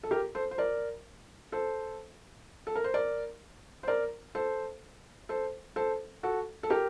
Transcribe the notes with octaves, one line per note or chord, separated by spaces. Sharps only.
A4
G4 A#4
A4 C5
C5
A#4 D5
A4 C5
A4
A#4
C5
A#4 D5
C5
A#4 D5
A4 C5
A4 C5
A4 C5
F#4 A4
A4
G4 A#4